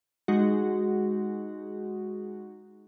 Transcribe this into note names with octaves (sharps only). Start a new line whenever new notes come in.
G#3 D#4 F#4